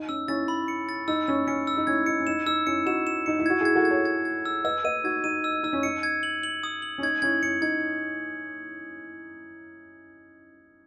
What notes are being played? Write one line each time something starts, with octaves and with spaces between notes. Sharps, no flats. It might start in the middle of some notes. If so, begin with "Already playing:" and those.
Already playing: D#4
C#4 E6
C#4 E4 A6
B5
C#7
A6
D#4 E6
C#4 E6
C#4 C#7
E6
D#4
C#4 E4 G#6
D#4 C#7
C#4
D#4 E7
D#4 E6
C#4 E4 C#7
D#4 F#4 E7
E7
D#4 C#7
E4
F#4 G#6
E4 G#4 G#6
F#4 A4
G#6
A4 C#5
G#6
G#6
E6
B4 D#5 E6
B4 D#5 D#7
D#4 F#4 G#6
D#4 D#7
E6
D#4 E6
C#4
D#4 C#7
G#6
F#7
F#7
D#6
F#7
C#4
D#4 G#6
C#4 E4 G#6
C#4 C#7
D#4 G#6